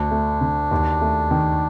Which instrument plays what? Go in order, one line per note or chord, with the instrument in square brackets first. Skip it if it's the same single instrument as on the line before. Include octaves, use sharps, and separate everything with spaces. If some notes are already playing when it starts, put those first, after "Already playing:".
Already playing: [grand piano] D2 [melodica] D4
[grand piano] A3
D3
D#2
A3
D#3